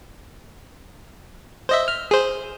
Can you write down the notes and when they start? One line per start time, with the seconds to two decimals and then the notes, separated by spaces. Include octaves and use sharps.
1.69 C5 D#5 E5
1.88 F6
2.11 G#4 C5